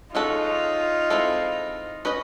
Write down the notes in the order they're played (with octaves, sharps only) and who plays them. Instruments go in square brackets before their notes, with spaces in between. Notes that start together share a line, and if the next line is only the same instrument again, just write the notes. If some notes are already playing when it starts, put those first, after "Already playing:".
[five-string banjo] G#3 C#4 F#4 A4 [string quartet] D#4 F4
[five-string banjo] G#3 C4 E4 A4
C#4 F#4 B4 D#5